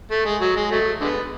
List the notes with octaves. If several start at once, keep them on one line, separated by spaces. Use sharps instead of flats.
A3
G#3
F#3
G#3
F#3 A3
D3 G#3 B3